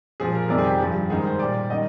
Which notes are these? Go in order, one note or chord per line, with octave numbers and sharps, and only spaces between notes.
A#2 F3 G#4
A#4
F2 C3 D#3 G3 D5
G#4
G4
G2 F3 G#4
G#2 D#3 G3 G#4
C5
A#2 G3 D5
D#3 G3 D#5